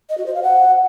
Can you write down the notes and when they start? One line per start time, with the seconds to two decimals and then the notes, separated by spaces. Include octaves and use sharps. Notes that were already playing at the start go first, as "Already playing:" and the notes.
0.09 D#5
0.18 F#4
0.26 C5
0.35 F5
0.43 F#5